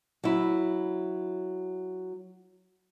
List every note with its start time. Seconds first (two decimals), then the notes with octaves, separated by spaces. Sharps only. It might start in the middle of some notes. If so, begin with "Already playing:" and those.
0.24 F#3 E4